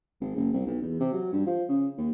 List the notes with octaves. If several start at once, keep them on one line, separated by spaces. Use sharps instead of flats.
G#1
F#1
C2
B1
E2
C3
F#3
G2
F3
C#3
D#2